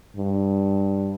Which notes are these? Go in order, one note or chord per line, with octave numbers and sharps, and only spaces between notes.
G2